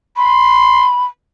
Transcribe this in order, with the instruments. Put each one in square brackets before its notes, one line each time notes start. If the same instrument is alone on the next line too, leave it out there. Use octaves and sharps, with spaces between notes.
[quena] B5 [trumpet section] C6